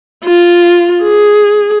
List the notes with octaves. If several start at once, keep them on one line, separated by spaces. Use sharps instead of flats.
F4
G#4